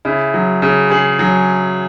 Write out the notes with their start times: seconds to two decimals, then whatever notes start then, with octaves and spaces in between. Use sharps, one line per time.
0.05 C#3 E4
0.34 F#3
0.62 C#3
0.90 C#3 G#4
1.19 F#3